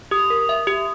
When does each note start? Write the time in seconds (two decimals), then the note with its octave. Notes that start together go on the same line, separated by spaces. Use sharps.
0.11 G4 D#6
0.30 A#4
0.49 E5
0.67 G4